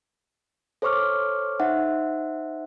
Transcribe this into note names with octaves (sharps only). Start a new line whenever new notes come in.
A4 C5 C#5 C#6 D6 F6
D#4 C5 E5 F#5